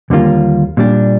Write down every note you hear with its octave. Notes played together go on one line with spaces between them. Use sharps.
D#2 D3 G3 A#3 F4
A#2 G3 D4